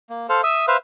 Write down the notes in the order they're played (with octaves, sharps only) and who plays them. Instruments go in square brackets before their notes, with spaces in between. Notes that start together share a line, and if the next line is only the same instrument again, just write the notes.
[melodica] A#3
A4 C5 F5
E5 D#6 E6
B4 C5 E5 F5